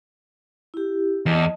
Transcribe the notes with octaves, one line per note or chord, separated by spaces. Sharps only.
E4 G4
E2 D#5 A5